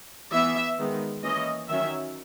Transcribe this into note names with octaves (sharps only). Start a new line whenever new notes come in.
E3 B3 E5
D#3 G#3 B3
E3 A#3 C#4 D#5
D#3 F#3 C#4 E5